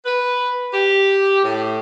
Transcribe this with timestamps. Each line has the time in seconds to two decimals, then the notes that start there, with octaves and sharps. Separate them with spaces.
0.05 B4
0.73 G4
1.44 A2